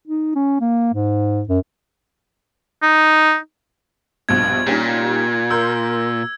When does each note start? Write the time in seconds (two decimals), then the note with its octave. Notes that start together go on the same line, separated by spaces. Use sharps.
0.07 D#4
0.36 C#4
0.61 A#3
0.94 G#2
1.49 F#2
2.82 D#4
4.29 A#1 G2 B2 G#6
4.67 A#2 G3 C#4 D#4
5.51 A#4 C6 E6 G6